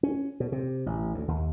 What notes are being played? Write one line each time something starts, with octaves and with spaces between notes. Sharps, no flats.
C#4
B2
C3
A1
D2
D#2